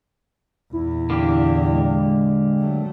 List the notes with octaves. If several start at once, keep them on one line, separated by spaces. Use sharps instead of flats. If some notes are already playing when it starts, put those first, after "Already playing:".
E2 A#2 E4
D3 A#3 G4
G#3
F#3 A3